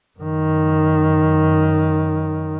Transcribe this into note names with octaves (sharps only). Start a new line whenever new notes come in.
F#2 D#3